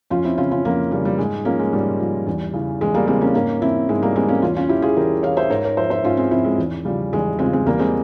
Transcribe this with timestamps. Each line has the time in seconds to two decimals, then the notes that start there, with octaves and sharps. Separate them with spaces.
0.10 F2 C#4 F4
0.25 C4 E4
0.38 C#3 E3 C#4 F4
0.51 C#4 F4
0.65 F2 A#3 C#4
0.91 C#3 E3 G3 A#3
1.05 G3
1.18 G#2 G#3
1.45 F3 A#3 C#4
1.59 G#3
1.72 G#2 G3
2.00 F3
2.27 E2
2.53 C#3 E3
2.81 E2 G#3
2.94 G3 A#3
3.07 C#3 E3 G#3 C4
3.21 A#3 C#4
3.34 G#2 A#3 C#4
3.61 E3 C4 E4
3.88 G#2 G#3
4.02 G3 A#3
4.16 E3 G#3 C4
4.29 A#3 C#4
4.42 E2 C#4 F4
4.56 C#4 F4
4.69 E3 E4 G4
4.82 F4 G#4
4.96 E2 G4 A#4
5.23 E3 C#5 F5
5.37 C5 E5
5.50 G#2 A#4 C#5
5.64 A#4 C#5
5.77 F3 C5 E5
5.90 C5 E5
6.04 G#2 C#4 F4
6.17 G#3 C4
6.31 F3 C4 E4
6.45 G#3
6.58 E2
6.85 C#3 F3 G3
7.13 E2 G#3
7.39 C#3 F3 G#3 C4
7.53 G#3 C4
7.66 E2 G3 A#3
7.79 G#3 C4